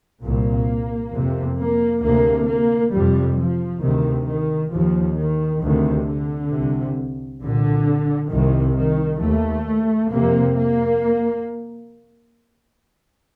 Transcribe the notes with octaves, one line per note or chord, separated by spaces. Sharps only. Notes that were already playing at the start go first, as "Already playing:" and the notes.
C2 A#2 A#3
F2 C3
A#3
D2 C3 A#3
A#3
F2 C3 G3
F3
D2 C3 D#3
D#3
D#2 F3
D#3
D2 C3 D#3
D3
C2 C3
C2 A#2 D3
C2 C3 D#3
D#3
D#2 A3
F2 C3 A#3
A#3